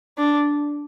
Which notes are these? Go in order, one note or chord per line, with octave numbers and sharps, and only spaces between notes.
D4